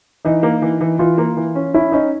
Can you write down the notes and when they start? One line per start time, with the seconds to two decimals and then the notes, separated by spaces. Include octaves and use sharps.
0.25 E3 D#4
0.43 A#3
0.62 E3
0.81 E3
0.99 E3 F4
1.18 A#3
1.37 E3
1.55 C#4
1.74 C#4 E4
1.92 C#4 D#4